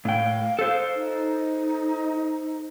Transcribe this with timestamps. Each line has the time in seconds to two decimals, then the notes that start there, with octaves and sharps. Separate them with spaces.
0.05 A2 F5 G5
0.59 A4 C5
0.95 D#4